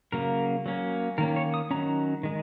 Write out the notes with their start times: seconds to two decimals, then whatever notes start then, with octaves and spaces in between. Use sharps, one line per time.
0.12 C#3 F#3 A#3 A#4
0.66 F#3 A#3 C#4
1.18 D#3 A#3 C#4 A#4
1.36 C#5
1.54 D#6
1.71 D#3 F#3 C#4 A#5
2.23 D#3 G#3